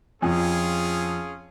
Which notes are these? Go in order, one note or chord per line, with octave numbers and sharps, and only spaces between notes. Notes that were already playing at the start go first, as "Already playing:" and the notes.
F2 C#4 F4 G#4